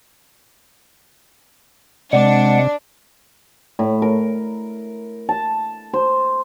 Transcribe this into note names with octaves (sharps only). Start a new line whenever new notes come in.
C3 G#3 D4 D5 F#5
A2
A#4
A5
C5